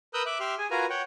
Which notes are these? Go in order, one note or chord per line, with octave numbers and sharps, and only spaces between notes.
A#4 B4 D#6 E6 F#6 G6
E5 D6 F#6
G4 E5 C6 F6
G#4 G#5
F4 F#4 A#4 B4 G#5 A#5
C#5 F#5 G5